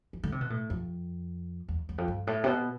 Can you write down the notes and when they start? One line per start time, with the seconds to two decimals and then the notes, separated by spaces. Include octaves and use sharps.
0.13 E3
0.23 D3
0.32 C3
0.41 B2
0.50 A2
0.70 F2
1.69 E2
1.89 E2
1.98 F2
2.08 G2
2.27 A2
2.44 C3
2.47 B2